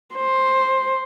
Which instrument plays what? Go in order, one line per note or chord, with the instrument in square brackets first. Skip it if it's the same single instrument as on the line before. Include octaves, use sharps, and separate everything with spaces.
[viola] C5